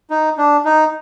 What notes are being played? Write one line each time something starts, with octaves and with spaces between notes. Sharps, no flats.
D#4
D4
D#4